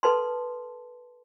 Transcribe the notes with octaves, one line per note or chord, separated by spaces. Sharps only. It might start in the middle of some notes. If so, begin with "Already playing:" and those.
A4 B4 A5 C6